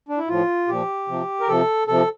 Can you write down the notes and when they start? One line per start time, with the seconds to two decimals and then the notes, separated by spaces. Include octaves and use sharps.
0.09 D4
0.18 E4
0.28 A2 F3 F4
0.67 A#2 F3 G4
1.08 C3 F3
1.40 A#4
1.48 C3 F3 A4
1.88 C3 F3 A4